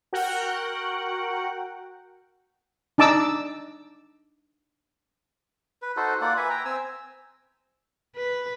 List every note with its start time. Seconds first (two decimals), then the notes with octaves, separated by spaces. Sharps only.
0.13 F#4 A#4 F#5 G5
2.98 D4 D#4 A5 D6 E6
5.82 B4
5.97 D#4 F#4 A4 C5
6.21 A#3 F4 D5 F#5
6.37 B4 E5 G#5
6.50 G5 A#5
6.65 C4 G#5 E6
8.16 B4